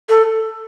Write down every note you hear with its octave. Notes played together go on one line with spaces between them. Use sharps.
A4